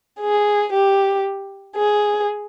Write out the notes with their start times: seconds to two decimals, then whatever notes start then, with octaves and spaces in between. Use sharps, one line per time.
0.20 G#4
0.72 G4
1.76 G#4